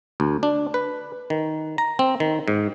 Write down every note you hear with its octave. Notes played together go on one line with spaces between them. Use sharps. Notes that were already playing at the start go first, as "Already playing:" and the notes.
D2
D4
B4
D#3
A#5
C4
D#3
G#2